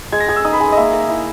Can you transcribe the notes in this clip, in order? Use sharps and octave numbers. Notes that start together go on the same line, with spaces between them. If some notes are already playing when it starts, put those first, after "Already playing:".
G#3 G#6
A#6
G#4 G#6
E6
D#4 D#6
B5
G#3 G#5
D#5
A#3 E5
A#4
E4